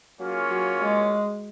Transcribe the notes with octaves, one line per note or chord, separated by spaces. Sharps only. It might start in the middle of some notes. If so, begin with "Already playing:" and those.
F#3 A#3 C#4 F4 G#4 C#5
F#3
G#3